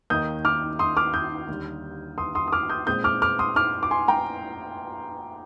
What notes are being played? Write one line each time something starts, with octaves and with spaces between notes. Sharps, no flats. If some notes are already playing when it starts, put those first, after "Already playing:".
D#2 D#3 A#3 D#4 D#6 G6
D6 F6
C6 D#6
D6 F6
D#6 G6
D#2 D3 G3
C6 D#6
C6 D#6
D#6
D6 F6
D#6 G6
A#2 G#3 C4 D#6 G6
D6 F6
D6 F6
C6 D#6
D6 F6
D6
G#5 C6
G5 A#5